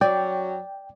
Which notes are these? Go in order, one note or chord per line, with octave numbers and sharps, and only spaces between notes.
F#2 F#3 D5 G5